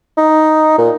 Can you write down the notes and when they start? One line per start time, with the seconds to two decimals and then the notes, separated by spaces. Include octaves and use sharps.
0.17 D#4
0.78 A#2